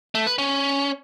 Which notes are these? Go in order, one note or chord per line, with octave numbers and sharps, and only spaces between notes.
A3
B4
C#4